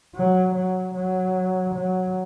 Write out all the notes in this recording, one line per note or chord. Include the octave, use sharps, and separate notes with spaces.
F#3
F#3
F#3
F#3